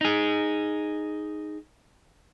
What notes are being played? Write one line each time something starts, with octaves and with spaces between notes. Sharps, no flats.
D#4 G#4